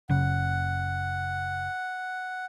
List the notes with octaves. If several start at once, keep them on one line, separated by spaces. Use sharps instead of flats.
F#1 C#3 F#5